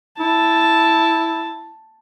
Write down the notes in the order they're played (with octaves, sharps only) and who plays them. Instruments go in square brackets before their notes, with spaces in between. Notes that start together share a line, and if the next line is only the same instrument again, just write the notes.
[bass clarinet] E4 [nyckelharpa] A5